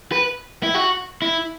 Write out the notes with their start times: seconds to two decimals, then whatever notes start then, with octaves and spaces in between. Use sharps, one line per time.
0.12 B4
0.63 E4
0.74 F#4
1.22 E4